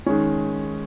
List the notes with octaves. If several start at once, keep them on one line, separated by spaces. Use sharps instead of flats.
D#3 G#3 C#4